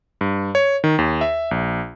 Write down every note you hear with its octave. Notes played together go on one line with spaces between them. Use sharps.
G2
C#5
D#3
D#2
E5
A#1